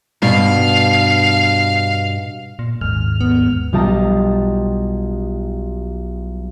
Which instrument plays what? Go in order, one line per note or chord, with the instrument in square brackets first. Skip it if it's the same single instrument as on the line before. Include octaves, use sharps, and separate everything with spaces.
[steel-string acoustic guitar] G2 B2 [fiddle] F5
[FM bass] A#2
[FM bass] G#1 [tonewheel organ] D#2 G#2 F6
[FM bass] B3
[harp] B1 G3 F4 G4 D#5 A5